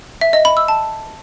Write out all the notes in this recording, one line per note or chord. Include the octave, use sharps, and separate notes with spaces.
E5
D#5
B5
E6
A5